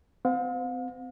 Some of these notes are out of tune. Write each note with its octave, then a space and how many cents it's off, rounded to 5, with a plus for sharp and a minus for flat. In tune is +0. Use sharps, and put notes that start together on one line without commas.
C4 -35 F5 +40